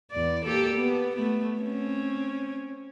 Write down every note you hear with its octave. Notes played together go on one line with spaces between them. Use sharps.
E2 D5
A#3 G4 A4
B3
A3 B3
C4 C#4